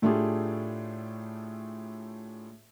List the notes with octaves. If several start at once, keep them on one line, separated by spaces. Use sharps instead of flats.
A2 A3 D4 F4 G4 G#4